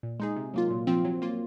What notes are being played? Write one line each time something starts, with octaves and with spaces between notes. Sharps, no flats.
A#2
G#3 D#4 G#4
C3
F#3 A#3 F4
A#2
F3 C4 F4
F#3
A#3 F4